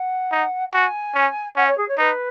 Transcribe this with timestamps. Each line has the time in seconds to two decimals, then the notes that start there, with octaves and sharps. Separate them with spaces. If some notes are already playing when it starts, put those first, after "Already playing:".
Already playing: F#5
0.31 D#4
0.73 F#4 G#5
1.14 C#4
1.57 C#4 F#5
1.67 C#5
1.77 G#4
1.88 C#5
1.98 D#4 B4